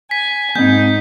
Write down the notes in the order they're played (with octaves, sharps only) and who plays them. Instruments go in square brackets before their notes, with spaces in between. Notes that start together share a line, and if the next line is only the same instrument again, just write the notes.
[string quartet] G#5 [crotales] B6
[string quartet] G#2 D#4 [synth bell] A#3 C4 [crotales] G6